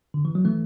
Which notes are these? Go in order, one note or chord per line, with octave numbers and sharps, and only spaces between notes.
D3
E3
F#3
E3 A3